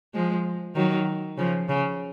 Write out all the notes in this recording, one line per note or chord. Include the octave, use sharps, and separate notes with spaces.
F3 G#3
D#3 F#3
C#3 F3
C#3